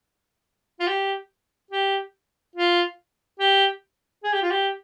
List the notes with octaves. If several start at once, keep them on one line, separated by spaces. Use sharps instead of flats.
F4
G4
G4
F4
G4
G#4
G4
F4
G4